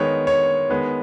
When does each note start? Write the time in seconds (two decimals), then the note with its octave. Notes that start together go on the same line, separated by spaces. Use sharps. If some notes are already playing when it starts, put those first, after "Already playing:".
Already playing: D#3 G#3 B3 C#5
0.27 C#5
0.69 D#3 G#3 B3